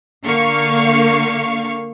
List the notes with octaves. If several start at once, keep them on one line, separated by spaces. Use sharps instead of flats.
D3 A#3 F5 C#6